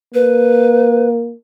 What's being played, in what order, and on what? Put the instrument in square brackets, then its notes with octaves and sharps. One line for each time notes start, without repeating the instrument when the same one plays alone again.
[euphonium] A#3 [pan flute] B4